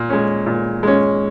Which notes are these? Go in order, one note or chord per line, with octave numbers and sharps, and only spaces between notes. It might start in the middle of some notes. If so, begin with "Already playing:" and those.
Already playing: A#2
G#3 C#4
A#2
G#3 C#4